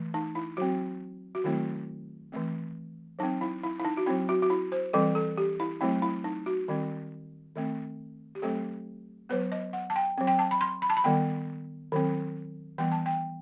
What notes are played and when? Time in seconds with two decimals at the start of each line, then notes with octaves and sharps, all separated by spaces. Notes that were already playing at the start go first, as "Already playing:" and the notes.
Already playing: E3 A3
0.14 D#4
0.35 E4
0.57 F#3 C4 F#4
1.35 F#4
1.44 D#3 F#3 A3 C4 E4
2.32 E3 A3 C4
3.19 F#3 C4 D#4
3.41 E4
3.63 E4
3.80 E4
3.85 D#4
3.97 F#4
4.06 F#3 C4 E4
4.29 F#4
4.42 F#4
4.50 E4
4.72 C5
4.93 E3 G3 C4 A4
5.15 A4
5.38 G4
5.60 E4
5.81 F#3 A3 C4 E4
6.02 E4
6.24 D#4
6.46 F#4
6.68 D#3 G3 C4
7.55 D#3 A3 C4
8.35 G4
8.42 F#3 A3 C4 A4
9.29 F#3 B3 B4
9.52 D#5
9.73 F#5
9.90 A5
9.96 G5
10.18 F#3 C4
10.27 G5
10.39 A5
10.51 B5
10.61 C6
10.82 B5
10.90 A5
10.97 B5
11.04 D#3 G3 B3 G5
11.92 D#3 F#3 C4
12.78 E3 G3 B3 G5
12.92 A5
13.06 G5